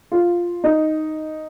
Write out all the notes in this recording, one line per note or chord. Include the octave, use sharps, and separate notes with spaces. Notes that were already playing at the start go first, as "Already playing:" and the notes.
F4
D#4